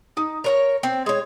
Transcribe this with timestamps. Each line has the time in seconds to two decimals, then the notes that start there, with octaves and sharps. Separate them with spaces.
0.17 D#4
0.44 A#4 C#5 A#5
0.83 C4
1.06 G#3 C#5